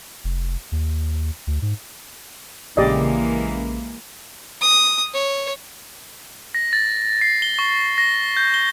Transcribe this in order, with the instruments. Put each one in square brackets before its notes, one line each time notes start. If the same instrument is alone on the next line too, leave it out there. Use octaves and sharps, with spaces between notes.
[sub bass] F1
D#2
D2
G#2
[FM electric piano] A#1 C#3 [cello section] E3 G#3 A#3 [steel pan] G4 D5 D#5
[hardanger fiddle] D#6
C#5
[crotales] A#6
A6
C7
G7
C#6
A#6
G6
G7